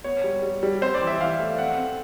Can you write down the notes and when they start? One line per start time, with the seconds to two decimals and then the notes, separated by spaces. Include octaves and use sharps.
0.04 B3 C#5
0.24 G3
0.42 G3
0.63 G3
0.82 C4 C5
0.94 D5
1.02 E3
1.07 E5
1.21 E3 F5
1.39 A3
1.58 C4 F#5
1.78 C4